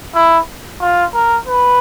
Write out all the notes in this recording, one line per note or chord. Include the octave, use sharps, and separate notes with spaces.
E4
F4
A#4
B4